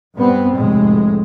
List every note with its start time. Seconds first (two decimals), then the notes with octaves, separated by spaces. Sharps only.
0.15 G2 B3 C4
0.55 F1 A2 G#3